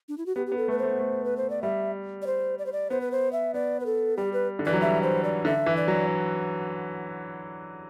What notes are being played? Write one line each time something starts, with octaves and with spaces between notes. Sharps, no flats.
D4
E4
F#4
B3 G4
G4
B3
A4
A3
B4
A3 C5
B3
A3
B4
C5
D5
G3 E5
D5
C5
D5
C5
D5
B3 C5
B4
C5
E5
B3 D5
B4
A4
G3 G4
B4
D3
E3 D5
F#3
G3 E5
C5
D5
D3 E5
E3
D5
F#3